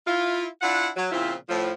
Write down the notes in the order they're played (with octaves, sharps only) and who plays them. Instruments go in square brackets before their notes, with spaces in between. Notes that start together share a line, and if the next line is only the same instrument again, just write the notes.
[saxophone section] E4 F4
D4 E4 F4 F#5
F#3
A#2 C#3 F3 C4 E4 F4
A2 F3